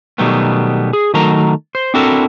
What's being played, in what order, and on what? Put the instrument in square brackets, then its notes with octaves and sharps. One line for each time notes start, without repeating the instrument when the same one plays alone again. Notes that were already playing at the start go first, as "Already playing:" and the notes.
[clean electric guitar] B2 D#3 F#3 G3 A3 B3
G#4
D#3 F#3 A3 A#4 A#5
C5
C4 D4 E4 F#4 A4 A#4